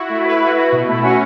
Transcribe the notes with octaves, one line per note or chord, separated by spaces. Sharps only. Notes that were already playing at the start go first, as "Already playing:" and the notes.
Already playing: E4 F#4
A3
B4
F#4
F#4
B2
A3 E4
C#4 F#4